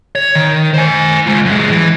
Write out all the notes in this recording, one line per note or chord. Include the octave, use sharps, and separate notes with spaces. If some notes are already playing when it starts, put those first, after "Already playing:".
C#5
D#3
C5 G#5
G#3 F4
F#2 G#3
E3